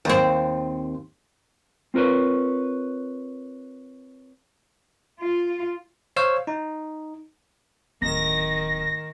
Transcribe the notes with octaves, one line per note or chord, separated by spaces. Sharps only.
D#2 C4
C4 F4 A#4 B4 C#5
F4
C5 C#5 F5 E6
D#4
D1 D#3 A#6